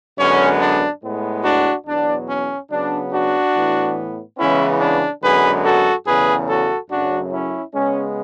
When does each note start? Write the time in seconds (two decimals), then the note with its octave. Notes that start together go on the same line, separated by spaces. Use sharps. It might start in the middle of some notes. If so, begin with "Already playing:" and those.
0.18 F#2 D3 G#3 B3 C#4
0.60 D4
1.02 A2 G#3 B3
1.44 D4 F#4
1.86 E2 B2 F#3 B3 D4
2.28 C#4
2.70 C#3 F#3 B3 D4
3.12 D4 F#4
3.55 A2 E3 B3
4.38 C#3 E3 G#3 B3 C#4 E4
4.80 D4
5.22 F#2 D3 G#3 B3 G#4 B4
5.65 F#4 A4
6.06 E2 C#3 F#3 A3 G#4 B4
6.48 F#4 A4
6.90 F#2 C#3 F#3 A3 D4 F#4
7.32 C#4 E4
7.74 C#3 G#3 B3 C#4